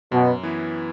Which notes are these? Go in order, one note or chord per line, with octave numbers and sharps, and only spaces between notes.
F#2 B2
E3 B3 E4